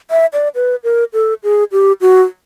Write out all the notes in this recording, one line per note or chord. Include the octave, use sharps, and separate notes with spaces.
E5
D5
B4
A#4
A4
G#4
G4
F#4